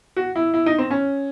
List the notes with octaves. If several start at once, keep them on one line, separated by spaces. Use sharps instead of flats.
F#4
E4
E4
D#4
C4
C#4